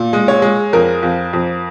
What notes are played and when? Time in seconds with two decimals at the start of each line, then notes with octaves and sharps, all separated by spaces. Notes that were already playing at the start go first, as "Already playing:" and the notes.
Already playing: A#2
0.13 G#3
0.28 C#5
0.42 G#3
0.73 F2 A#4
1.03 F2
1.33 F2